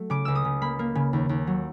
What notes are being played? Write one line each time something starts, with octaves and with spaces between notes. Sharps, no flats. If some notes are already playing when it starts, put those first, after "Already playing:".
Already playing: F#3 A3
C#3 D6
C#2 E6
D#6
C#3
A#3 B5
A#3
C#3
D#2
D#2
F#3